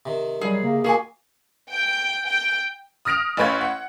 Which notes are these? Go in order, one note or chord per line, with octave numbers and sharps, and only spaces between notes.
C3 D#3
F#3 G3 G#4
C#3 A#3
B2 A#3 G#4 G#5 C#6
G5
G5
D#6 F6 A#6 D7 F7
A1 C#4 B4 C#5 G#6
F#5